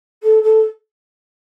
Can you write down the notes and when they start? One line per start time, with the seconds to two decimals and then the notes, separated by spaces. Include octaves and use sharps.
0.23 A4
0.43 A4